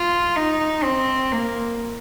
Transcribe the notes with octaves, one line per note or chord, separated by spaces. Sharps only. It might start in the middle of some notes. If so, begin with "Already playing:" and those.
Already playing: F4
D#4
C4
A#3